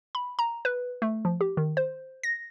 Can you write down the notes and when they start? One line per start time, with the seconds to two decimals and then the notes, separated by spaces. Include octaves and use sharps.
0.15 B5
0.39 A#5
0.65 B4
1.02 A3
1.25 F3
1.41 G4
1.57 D#3
1.77 C5
2.23 A#6